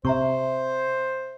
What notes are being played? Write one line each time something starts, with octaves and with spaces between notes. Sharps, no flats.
C3 C5 E5 A#5 C#6